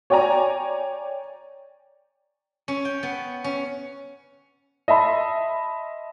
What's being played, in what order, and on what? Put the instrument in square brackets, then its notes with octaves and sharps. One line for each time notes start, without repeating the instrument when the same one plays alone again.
[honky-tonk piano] C#5 D5 G5 G#5 A#5
[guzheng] C#4
G5
B3
C#4
[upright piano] D#5 E5 A5 B5 C6